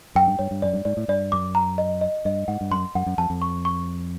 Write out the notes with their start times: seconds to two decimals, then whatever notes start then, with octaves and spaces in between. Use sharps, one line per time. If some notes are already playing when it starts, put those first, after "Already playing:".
0.15 F#2 G5
0.27 G2
0.39 G2 C#5
0.51 G2
0.62 F#2 D5
0.73 G2
0.85 G#2 D5
0.97 A2
1.08 G2 D5
1.32 F#2 D6
1.55 A#5
1.78 D#5
2.01 D#5
2.25 G2 D#5
2.48 G#2 F#5
2.61 G2
2.71 F#2 C6
2.95 F#2 F#5
3.06 F#2
3.18 F2 A5
3.30 F2
3.42 C#6
3.65 C#6